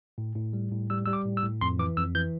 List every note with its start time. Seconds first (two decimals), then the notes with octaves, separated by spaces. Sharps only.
0.18 A2
0.36 A2
0.53 G3
0.71 A2
0.90 G3 E6
1.06 G3 E6
1.13 D6
1.25 A2
1.37 E6
1.43 A2
1.61 F2 C6
1.79 E3 D6
1.97 F2 E6
2.15 E3 G6